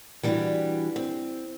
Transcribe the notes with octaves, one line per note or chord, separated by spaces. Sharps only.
E3 G3 B3 D4 F#4 G4
C4